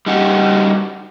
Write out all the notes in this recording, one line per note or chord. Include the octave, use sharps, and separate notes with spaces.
G3 D#4 F#4 G4